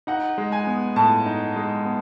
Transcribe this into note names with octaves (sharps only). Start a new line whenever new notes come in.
D#4 F#5
G#3
G#5
B3
A2 A5
D#4
G#3
B3